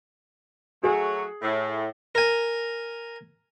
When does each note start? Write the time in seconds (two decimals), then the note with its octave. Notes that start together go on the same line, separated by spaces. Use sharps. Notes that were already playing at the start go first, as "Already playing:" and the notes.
0.83 F#3 A3 F#4 G#4
1.42 A2
2.15 A#4 G#5